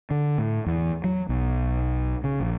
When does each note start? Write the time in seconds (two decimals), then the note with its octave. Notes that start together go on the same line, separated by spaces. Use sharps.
0.11 D3
0.38 A2
0.66 E2
1.04 F#3
1.29 B1
2.24 C#3
2.40 A#1